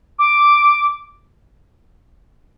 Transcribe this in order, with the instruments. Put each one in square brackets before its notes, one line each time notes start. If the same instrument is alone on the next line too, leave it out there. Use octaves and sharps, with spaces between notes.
[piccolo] D6